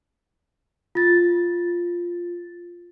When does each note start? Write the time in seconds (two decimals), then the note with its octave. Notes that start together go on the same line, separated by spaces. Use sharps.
0.95 F4 A6